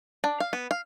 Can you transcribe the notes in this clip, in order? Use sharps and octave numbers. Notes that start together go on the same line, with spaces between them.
D4
F5
B3
F5